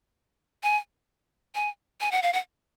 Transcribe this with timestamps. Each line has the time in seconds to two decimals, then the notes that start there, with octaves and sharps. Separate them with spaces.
0.63 G#5
1.55 G#5
2.01 G#5
2.12 F#5
2.23 F5
2.33 F#5